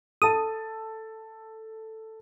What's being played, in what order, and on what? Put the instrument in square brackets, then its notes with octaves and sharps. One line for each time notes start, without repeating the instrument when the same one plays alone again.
[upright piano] A4 A5 [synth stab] D#6